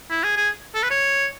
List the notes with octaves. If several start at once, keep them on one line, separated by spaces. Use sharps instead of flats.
E4
G#4
G#4
A4
B4
C#5